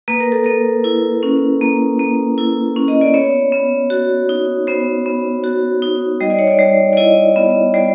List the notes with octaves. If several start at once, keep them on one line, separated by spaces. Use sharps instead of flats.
A#3 B4
A#4
A4
A#3 A#4
E4
C#4
A#3
A#3
E4
C#4
D#5
D5
B3 C#5
B3
F#4
D#4
B3 C5
B3
F#4
D#4
G3 D#5
D5
C#5
D5
G3
D5
E4 D#5
B3
G3 D5